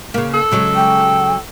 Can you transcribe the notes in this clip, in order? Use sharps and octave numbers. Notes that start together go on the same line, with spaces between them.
C#3 A#3
A4
C#3 F#3 G#3
G5